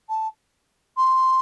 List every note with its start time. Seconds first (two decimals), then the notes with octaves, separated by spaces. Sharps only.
0.08 A5
0.96 C6